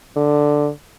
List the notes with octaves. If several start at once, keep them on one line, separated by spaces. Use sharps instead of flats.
D3